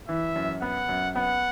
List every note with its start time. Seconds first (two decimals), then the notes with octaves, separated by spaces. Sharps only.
0.09 E3 E5
0.36 F#2
0.62 B3 F#5
0.89 F#2
1.16 B3 F#5